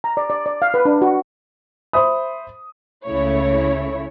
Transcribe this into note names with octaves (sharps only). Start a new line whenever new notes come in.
A#5
D5
D5
D5
F5
B4
D4
F#4
C5 E5 B5 D#6
C#2 C#3 A3 E4 C#5